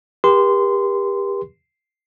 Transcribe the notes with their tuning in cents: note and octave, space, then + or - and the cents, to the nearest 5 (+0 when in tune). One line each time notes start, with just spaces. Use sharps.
G4 +25 A#4 +45 C6 -20